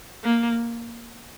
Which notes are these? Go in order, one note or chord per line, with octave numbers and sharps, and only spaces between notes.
A#3